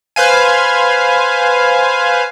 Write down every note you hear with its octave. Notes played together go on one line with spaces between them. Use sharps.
B4 C5 F5 G#5